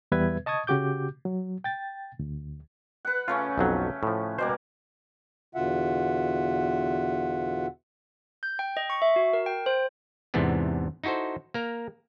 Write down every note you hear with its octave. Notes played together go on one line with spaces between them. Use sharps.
E2 G3 B3 B4 E5 G#6
D#5 A5 C#6 D#6 G#6
C#3 F#4 G4 D6 G6
F#3
G5 A6
D2
B4 F#5
C#3 A3 C#4 F4
B1 F2 F#3
A2 F3
B2 G3 A#3 C5
E2 B2 D3 F4 E5 F#5
G6
G5
D#5
C#6
E5
F#4
A#4
G5
C5
E2 G#2 C3 E3 B3 D4
D#4 E4 F#4 A4 C5
A#3 A#4